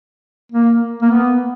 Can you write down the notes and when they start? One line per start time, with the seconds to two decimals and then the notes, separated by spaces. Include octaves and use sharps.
0.52 A#3
1.02 A#3
1.11 B3